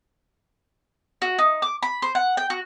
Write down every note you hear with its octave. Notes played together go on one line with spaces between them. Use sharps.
F#4
D#4
D6
B5
C5
F#5
G5
F#4